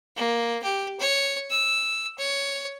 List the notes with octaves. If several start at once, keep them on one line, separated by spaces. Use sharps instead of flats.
A#3
G4
C#5
E6
C#5